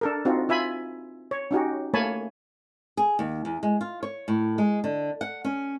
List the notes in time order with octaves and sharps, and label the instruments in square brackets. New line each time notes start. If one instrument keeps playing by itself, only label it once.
[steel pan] D4 A4 A#4
C4 D#4 F4 F#4
F4 E5 G#5 B5
C#5
C#4 D#4 F#4 G4
A3 A#3 C#5 G#5 A5 B5
[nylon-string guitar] G#4
D#2
E2
G#3
F4
C#5
A2
G#3
D3
F#5
C#4